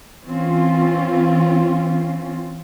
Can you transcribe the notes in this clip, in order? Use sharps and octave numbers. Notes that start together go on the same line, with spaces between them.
E3 C4 C#4 F4